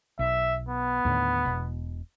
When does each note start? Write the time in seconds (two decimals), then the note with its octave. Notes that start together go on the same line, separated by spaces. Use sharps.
0.19 B1 E5
0.68 B3
1.05 D#2 A2 D3
1.45 E1 B2